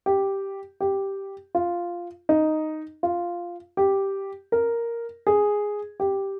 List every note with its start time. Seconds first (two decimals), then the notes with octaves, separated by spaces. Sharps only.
0.06 G4
0.80 G4
1.55 F4
2.29 D#4
3.03 F4
3.77 G4
4.52 A#4
5.27 G#4
6.00 G4